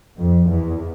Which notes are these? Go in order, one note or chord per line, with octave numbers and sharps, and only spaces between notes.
F2
E2